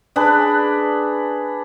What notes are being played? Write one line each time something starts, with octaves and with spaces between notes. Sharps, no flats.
D4 G#4 B4